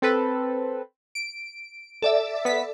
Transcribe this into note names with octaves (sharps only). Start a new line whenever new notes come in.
C4 A4 B4
D7
A4 D5 E5
B3 B6